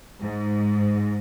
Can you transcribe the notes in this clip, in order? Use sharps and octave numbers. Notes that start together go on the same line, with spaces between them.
G#2